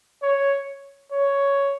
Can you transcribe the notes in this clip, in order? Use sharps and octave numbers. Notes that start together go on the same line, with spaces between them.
C#5
C#5